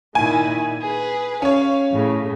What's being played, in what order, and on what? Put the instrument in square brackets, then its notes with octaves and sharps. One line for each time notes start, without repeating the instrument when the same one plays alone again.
[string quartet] A#2 D#3 E4 [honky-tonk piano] G#5
[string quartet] G#4 B4
[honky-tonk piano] C#4 C#5 [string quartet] F5
[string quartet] A2 C#3